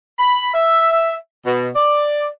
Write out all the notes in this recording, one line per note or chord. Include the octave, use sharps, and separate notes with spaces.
B5
E5
B2
D5